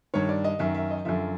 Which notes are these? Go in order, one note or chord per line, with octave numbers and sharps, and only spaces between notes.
G2 D#3 C#5
D5
D#5
F#2 D#3 E5
E5
D#5
F#2 D3 F3 E5